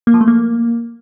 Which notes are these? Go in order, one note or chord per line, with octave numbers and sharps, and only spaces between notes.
A#3
F3
A3
A#3